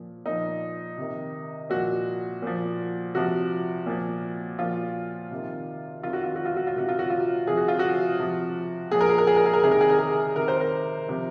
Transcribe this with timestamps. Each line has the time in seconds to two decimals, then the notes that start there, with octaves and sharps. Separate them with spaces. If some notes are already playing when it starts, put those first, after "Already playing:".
Already playing: A#2 F3
0.26 A#2 F3 D#4
0.97 C3 D#3
1.70 A#2 F3 F#4
2.42 A#2 F3
3.15 C3 F3 F#4
3.86 A#2 F3
4.59 A#2 F3 F4
5.31 C3 D#3
6.03 C3 D#3 F4
6.13 F#4
6.24 F4
6.36 F#4
6.45 F4
6.57 F#4
6.67 F4
6.75 C3 D#3 F#4
6.89 F4
6.99 F#4
7.10 F4
7.47 C3 F3 G#4
7.57 F#4
7.68 F4
7.79 F#4
8.19 C3 F3
8.91 A#2 F3 G#4
9.01 A#4
9.09 G#4
9.18 A#4
9.27 G#4
9.36 A#4
9.46 G#4
9.53 A#4
9.63 C3 D#3 G#4
9.71 A#4
9.81 G#4
9.89 A#4
9.99 G#4
10.36 C3 D#3 A#4
10.48 C5
10.60 A#4
11.08 C3 F3